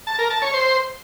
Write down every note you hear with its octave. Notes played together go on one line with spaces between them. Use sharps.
A5
A#4
A5
C#5
C5